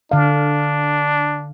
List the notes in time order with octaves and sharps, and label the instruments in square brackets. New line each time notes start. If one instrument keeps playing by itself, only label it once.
[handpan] D3 F5 [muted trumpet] D4